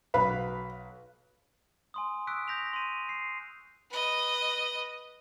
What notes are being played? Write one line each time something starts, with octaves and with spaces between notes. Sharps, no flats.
B1 B4 F5 B5
G#5 C6 D#6
C#6 D#6 E6 F#6 B6 D7
D#6 G6 A#6 B6 F7
C6 D#7
C7
B4 D#5